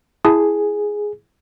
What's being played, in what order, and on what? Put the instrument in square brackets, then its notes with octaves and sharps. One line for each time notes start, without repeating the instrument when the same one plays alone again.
[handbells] E4 A5 D#6 [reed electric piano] G#4